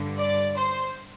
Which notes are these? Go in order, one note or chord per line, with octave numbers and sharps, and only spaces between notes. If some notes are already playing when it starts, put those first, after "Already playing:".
Already playing: G2 D3
D5
C5